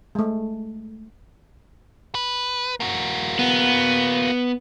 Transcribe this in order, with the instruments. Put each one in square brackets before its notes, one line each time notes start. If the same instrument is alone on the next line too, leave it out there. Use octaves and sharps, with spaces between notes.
[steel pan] G#3 A3
[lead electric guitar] B4
A#3 F#4
[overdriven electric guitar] B3